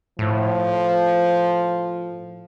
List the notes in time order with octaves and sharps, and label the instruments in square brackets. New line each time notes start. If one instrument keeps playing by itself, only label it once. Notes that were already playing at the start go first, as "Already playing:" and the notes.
[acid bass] A2 [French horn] F3